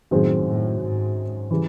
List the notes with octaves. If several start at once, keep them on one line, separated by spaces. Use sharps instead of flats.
F#2 A2 D#3 G#3 C4
A2
G#2
C#3 E3 G3